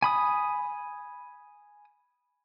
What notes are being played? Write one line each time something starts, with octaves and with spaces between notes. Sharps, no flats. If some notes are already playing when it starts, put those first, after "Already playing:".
G#5 B5 D#6